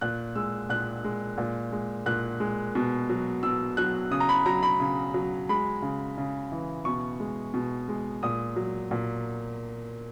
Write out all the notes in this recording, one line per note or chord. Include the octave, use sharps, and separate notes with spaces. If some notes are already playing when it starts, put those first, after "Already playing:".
A#2 F#6
G#3 E6
A#2 F#6
G#3
A#2
G#3
A#2 F#6
G#3
B2
F#3
B2 E6
F#3 F#6
C#3 D#6
A#5
B5
F#3 A#5
B5
C#3
F#3
G#3 B5
C#3
C#3
E3
B2 C#6
G#3
B2
G#3
A#2 D#6
F#3
A#2